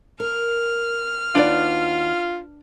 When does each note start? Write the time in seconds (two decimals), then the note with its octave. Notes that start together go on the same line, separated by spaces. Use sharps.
0.20 A#4 F6
1.35 D#2 D4 F4 F#4 B4 D5